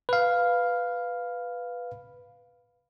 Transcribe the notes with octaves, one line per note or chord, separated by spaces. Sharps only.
B4 F5